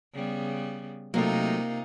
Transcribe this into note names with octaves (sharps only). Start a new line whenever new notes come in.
C#3 G3 B3
C3 F#3 A3 A#3 D#4 F4